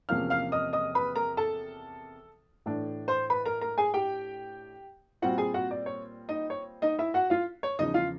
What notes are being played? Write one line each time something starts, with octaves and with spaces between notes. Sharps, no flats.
E2 C3 F3 A#3 C#4 F5 F6
F5 F6
D#5 D#6
D#5 D#6
B4 B5
A#4 A#5
A4 A5
A2 E3 A3 D4
C5 C6
B4 B5
A#4 A#5
A#4 A#5
G#4 G#5
G4 G5
A#2 G3 C4 F4 F#4 F#5
G#4 G#5
F#4 F#5
D5
C#5
D#4 D#5
C#5
D#4 D#5
E4 E5
F#4 F#5
F4 F5
C#5
E2 C#3 F3 D#4 D#5
F4 F5